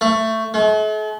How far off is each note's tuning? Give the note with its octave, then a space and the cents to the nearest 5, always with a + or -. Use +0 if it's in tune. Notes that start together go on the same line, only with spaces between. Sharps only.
A3 +15
A3 -45